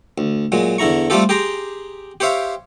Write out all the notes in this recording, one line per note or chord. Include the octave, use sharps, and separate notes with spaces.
D2
A#2 F#3 G#3
E2 D3 E4 A#5 C#6
G3 A3 C4 F4 G4 A4
G4 G#4 G5 A#5 C6
G4 C5 C#5 E5 F5